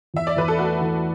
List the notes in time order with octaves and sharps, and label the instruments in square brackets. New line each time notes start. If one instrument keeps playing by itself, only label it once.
[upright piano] E2 [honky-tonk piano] E5
[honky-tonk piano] D5
[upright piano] E2 [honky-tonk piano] B4
[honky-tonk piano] A4
[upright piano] A3 [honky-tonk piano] F#4
[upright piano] E3